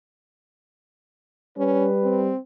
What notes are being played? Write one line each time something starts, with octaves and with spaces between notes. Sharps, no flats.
G3 C#4 B4
C4